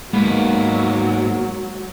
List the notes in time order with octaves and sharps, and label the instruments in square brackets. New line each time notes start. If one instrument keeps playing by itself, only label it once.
[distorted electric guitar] G#2 B4 [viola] F#3 [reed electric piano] G#3 [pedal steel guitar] A#3 B3